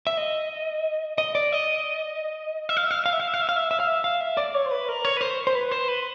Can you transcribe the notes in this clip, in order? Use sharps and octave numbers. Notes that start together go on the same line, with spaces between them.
E5
D#5
D#5
D5
D#5
E5
F5
E5
F5
E5
F5
E5
F5
E5
F5
E5
F5
E5
E5
F5
E5
F5
E5
D5
C#5
C5
B4
A#4
C#5
B4
C5
C5
B4
C5
B4